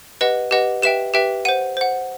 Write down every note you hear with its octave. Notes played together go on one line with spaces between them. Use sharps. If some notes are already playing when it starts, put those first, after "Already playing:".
G4 B4 D#5 F#5
G4 B4 D#5 F#5
G4 B4 E5 G5 E7
G4 B4 E5 G5
C5 F#5 D#7
C5 F#5